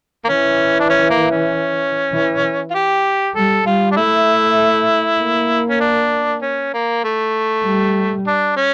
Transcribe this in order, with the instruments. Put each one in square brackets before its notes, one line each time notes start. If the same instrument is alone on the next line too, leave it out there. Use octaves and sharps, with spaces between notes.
[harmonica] A#3
[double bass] E3 [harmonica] C#4
[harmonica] D4
C#4
A#3
C#4
[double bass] E3
[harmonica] F4
G4
[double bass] G3 [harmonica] A4
[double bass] G3 [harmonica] F4
[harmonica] D4
[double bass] A3 [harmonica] E4
[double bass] A#3
[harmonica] C#4
D4
C#4
A#3
A3
[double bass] G3
[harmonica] D4
C#4